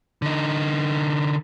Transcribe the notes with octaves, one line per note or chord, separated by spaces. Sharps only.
D3 D#4